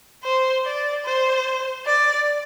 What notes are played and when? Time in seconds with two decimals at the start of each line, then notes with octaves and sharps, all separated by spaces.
0.24 C5
0.65 D5
1.05 C5
1.87 D5